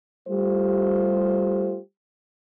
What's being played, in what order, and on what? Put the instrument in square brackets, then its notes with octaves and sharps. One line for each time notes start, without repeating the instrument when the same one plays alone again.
[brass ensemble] G3 A3 F4 G4 C5